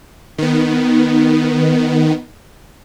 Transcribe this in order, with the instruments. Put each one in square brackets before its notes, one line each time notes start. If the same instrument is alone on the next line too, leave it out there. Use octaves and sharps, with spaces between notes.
[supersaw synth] D#3 B3